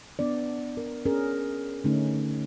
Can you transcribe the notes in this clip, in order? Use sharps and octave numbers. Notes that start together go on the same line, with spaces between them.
B3 D4 D5
A#4
C#4 G#4 A#4
D3 A3 C#4 D#4